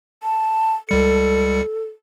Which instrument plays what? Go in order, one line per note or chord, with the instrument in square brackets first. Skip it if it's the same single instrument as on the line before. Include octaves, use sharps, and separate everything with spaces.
[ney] A5
[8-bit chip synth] C#2 G3 C#7 [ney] A4